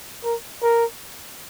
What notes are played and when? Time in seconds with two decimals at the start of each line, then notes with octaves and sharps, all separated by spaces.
0.24 A#4
0.62 A#4